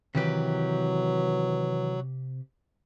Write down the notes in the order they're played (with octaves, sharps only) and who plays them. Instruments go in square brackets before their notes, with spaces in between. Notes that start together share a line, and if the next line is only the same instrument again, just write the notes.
[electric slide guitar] C3 G4 [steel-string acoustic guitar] D#3 E3 B4 [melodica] F#3